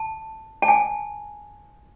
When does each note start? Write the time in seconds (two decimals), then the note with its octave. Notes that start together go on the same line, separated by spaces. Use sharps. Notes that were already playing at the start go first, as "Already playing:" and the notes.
Already playing: A5
0.62 A5
0.68 G#5